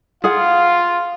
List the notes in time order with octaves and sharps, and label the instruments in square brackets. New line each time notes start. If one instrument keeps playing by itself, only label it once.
[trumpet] F4 [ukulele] G#4 F#5 [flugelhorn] F5